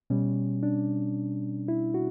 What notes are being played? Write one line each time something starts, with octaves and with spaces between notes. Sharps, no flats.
B2 G3 C#4
D4
E4
F#4